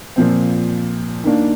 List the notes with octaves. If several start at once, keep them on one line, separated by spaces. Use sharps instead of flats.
A#2 F3 C4
D#3 A#3 D4